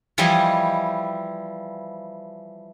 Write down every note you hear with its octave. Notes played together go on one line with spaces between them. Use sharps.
E3 F3 G3 E4 D#5 G#5